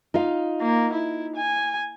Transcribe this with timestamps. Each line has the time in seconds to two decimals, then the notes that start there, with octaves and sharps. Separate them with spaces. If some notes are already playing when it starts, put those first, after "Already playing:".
0.14 D#4 F4 F5
0.61 A#3
0.93 E4
1.36 G#5